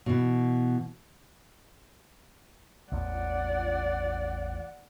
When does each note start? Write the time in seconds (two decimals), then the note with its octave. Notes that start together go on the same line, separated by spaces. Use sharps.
0.06 B2 E3
2.92 A1 E2 D5 F#5